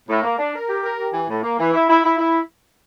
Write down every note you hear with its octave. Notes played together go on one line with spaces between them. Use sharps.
A2
A#3
D4
A#4
G4
A#4
G4
E3
A2
A#3
E3
E4
E4
E4
E4